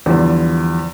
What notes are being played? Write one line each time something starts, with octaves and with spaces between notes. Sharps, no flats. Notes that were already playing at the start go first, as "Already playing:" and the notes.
E2 D3 F3 G3